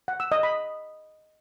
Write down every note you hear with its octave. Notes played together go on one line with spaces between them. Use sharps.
F#5
E6
D#5
B5